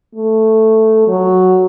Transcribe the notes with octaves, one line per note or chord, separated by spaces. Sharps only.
A3
F#3